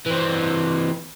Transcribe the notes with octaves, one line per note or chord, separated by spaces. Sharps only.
E3 C4